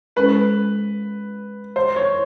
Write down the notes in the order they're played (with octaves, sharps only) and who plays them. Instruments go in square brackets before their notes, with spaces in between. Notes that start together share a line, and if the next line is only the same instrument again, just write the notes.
[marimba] G#3 C#4 E4 A4 C5 [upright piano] B4
[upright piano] C5
C#5